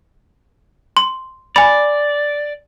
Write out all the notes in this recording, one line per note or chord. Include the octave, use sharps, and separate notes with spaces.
C6
D5 G#5 B5